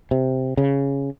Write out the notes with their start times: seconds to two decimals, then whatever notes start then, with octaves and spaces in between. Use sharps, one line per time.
0.11 C3
0.57 C#3